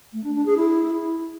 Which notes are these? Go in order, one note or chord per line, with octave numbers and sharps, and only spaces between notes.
A3
D4
D4
G#4
E4